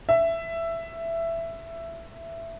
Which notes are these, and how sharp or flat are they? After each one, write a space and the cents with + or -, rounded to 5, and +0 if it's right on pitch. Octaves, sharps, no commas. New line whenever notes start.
E5 +10